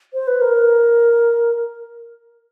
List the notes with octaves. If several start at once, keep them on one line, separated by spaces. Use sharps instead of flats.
C5
B4
A#4